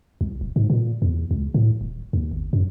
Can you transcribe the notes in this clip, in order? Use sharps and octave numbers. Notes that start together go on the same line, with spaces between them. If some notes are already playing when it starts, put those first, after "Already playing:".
C2
D#1
G#2
A#2
E2
C#2
A2
D#1
D#2
G1
F#2